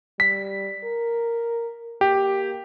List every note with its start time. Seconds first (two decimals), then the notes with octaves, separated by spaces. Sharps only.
0.20 G3 B6
0.84 A#4
2.01 A#3 G4